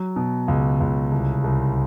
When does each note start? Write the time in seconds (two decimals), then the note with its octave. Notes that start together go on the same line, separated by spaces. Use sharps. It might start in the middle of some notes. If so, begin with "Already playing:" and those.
Already playing: F#3
0.16 B2
0.48 C#2
0.80 C#2
1.12 C2
1.44 C2